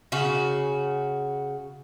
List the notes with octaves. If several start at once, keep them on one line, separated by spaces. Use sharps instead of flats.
C#3 F#4